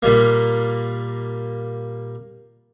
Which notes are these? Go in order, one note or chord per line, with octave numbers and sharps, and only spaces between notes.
A#2 G3 A#3